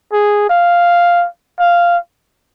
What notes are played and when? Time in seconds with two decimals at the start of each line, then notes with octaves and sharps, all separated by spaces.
0.13 G#4
0.49 F5
1.59 F5